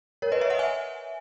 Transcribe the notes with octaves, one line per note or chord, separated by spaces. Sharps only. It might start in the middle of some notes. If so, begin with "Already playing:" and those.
A#4 C#5
B4 D#5
C#5 E5
D#5 F#5
E5 G#5